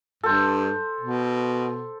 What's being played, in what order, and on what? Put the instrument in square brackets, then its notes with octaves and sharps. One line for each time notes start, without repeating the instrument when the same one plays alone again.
[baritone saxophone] G2 [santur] A4 C5
[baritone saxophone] B2